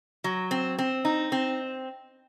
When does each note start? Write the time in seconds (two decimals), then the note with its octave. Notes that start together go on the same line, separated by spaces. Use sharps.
0.24 F#3
0.51 C4
0.78 C4
1.05 D#4
1.32 C4